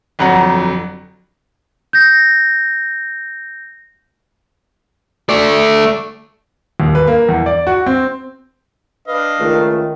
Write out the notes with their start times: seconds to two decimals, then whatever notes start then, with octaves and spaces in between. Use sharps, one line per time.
0.19 G1 F2 F#3 F#5 A#5
1.93 G6 A#6
5.29 A3 D5
6.80 D#2
6.95 B4
7.08 A#3
7.29 E2
7.46 D5
7.67 F#4
7.86 C4
9.08 D4 B4 D#5 F5
9.40 C#2 D#3 A3